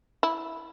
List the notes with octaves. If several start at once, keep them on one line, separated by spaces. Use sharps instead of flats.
E4